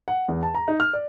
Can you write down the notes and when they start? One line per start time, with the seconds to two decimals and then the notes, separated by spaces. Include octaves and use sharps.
0.08 F#5
0.28 E2
0.43 A5
0.55 A#5
0.68 D#4
0.80 F6
0.93 D5